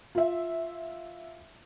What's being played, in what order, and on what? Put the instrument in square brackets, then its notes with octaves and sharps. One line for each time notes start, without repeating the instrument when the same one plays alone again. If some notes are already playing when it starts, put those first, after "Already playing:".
[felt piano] F4 E5